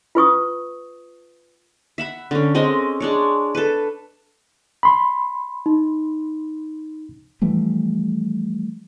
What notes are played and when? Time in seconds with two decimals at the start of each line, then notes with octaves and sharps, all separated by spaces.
0.15 F4 B4 C#6 D#6
1.98 E5 F#5 B5
2.31 D3 C#4
2.55 G#3 C4 C#4 D#5
3.00 G#3 D4 C#5
3.55 A4 B4
4.83 B5 C6
5.66 D#4
7.42 E3 F3 G3 A3